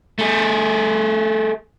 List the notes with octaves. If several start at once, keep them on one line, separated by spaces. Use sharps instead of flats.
A3 G#4